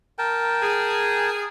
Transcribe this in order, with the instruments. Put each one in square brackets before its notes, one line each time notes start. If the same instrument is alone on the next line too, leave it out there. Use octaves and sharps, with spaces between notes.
[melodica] A#4 G5 A5
[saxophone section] G#4